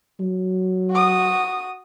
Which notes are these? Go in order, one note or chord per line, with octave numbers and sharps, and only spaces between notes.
F#3
F#4 D#6